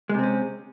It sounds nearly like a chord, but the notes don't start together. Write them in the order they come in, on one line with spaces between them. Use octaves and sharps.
G#3 C3 C4 C#4